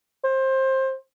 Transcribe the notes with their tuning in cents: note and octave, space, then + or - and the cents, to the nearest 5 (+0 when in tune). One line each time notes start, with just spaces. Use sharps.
C5 +20